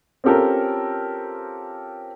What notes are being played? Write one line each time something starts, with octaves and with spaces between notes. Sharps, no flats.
C4 C#4 F4 G4 A4 A#4